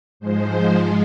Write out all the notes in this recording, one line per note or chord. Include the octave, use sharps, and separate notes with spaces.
G#2 F3 G#3 C5